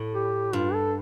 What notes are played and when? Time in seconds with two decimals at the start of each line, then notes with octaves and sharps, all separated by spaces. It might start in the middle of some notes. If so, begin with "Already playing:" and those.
Already playing: A2
0.15 G4
0.53 G2 F4
0.74 A4